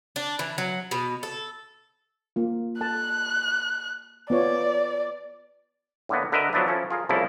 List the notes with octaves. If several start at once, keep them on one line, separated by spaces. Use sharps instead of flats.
D4
E3
F#3
B2
A4
A#3 F4
A4 A5 F#6
B3 F4 C#5 D5
A2 D3 A#3 B3
D3 A#4 B4 D#5 E5
F3 F#3 B3 D4 E4
F3 C#4 E4 A4
F4 G#4 A#4
C2 C#3 F3 A#3 E4 A4